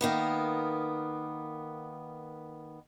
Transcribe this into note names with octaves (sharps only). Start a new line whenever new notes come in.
D#3 A#3 B3